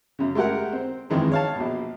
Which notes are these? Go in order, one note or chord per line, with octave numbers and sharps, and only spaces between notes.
F#2 C#3
G#3 A3 G4 A#4 F#5
C4
F2 D#3 E3 G#3 D4
C#5 F5 A5
A#1 B2